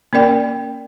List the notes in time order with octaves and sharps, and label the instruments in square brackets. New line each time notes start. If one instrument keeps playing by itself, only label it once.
[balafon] A#3 C#4 A#4 D5 G5